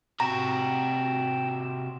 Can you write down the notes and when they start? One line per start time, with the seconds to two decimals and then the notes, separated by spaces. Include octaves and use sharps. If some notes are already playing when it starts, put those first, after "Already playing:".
0.20 C3 F#4 G5 A#5 E6